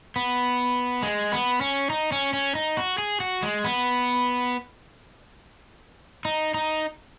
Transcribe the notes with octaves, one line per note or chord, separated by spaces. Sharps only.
B3
G#3
B3
C#4
D#4
C#4
C#4
D#4
F#4
G#4
F#4
G#3
B3
D#4
D#4